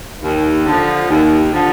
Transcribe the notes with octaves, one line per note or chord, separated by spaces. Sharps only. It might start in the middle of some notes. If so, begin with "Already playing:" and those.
D#2
D3 F3
D#2
D3 F3